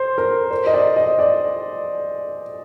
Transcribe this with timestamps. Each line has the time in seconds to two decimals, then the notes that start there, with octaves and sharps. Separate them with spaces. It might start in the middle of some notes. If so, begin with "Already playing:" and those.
Already playing: C5
0.18 A#4
0.51 C5
0.67 D#5
0.74 D5
0.96 D#5
1.19 D5